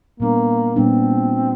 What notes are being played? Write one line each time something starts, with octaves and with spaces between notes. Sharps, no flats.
A#2 G3 A#3 B3 D4
A#2 G3 B3 C4 D4